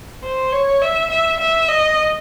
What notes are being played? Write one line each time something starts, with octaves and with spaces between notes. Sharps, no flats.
C5
C#5
E5
E5
E5
D#5